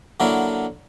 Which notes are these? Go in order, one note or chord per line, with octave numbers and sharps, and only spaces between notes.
D3 F#3 A#3 E4 A#4